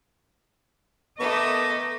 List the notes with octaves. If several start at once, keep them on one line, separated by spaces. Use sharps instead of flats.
A3 B3 A#4 D#5 D6